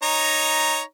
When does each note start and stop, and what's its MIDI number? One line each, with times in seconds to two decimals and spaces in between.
0.03 0.81 63
0.03 0.81 73
0.03 0.81 82